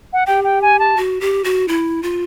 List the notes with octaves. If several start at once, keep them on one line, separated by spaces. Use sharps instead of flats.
F#5
G4 G5
G5
G#5
A5
F#4
G4
F#4
E4
F4